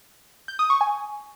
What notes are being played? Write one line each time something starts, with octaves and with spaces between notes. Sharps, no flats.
G6
D#6
C#6
G#5